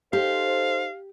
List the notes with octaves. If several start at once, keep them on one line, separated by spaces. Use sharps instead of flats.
D#4 G4 A4 C5 F5